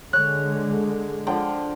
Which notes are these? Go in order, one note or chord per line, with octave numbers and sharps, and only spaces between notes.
D3 G#3 C#5 F#6
D3 F3 G5